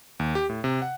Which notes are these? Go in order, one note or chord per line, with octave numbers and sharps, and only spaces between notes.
D#2
G4
A2
C3
F#5